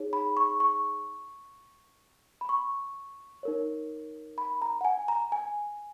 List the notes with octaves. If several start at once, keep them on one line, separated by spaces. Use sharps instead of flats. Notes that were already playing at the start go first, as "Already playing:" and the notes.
Already playing: D#4 G#4 C#5
B5
C#6
C#6
B5
C#6
D#4 A#4 C#5
B5
A#5
F#5
G#5
A#5
G#5